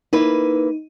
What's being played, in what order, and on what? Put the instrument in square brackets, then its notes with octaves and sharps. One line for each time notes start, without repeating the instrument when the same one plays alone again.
[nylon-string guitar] A#3 E4 B4 [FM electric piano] D#4